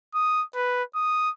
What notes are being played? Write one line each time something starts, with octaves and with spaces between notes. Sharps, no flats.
D#6
B4
D#6